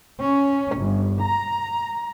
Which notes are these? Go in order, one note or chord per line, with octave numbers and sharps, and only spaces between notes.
C#4
G1
A#5